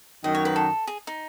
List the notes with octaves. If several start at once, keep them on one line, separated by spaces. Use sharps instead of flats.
F#2 D#3 F#3 D#5
C#5
B4
A4
G#4
D#4